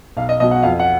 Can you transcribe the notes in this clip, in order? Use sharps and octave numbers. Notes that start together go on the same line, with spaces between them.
B1 F5
D#5
B2 F#3 D#5
F#5
F2 F5
F#5